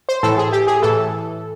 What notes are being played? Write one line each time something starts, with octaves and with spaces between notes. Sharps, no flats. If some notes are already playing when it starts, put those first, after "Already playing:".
C5
A2 E3 A4
G#4
G4
G#4
A2 E3 A4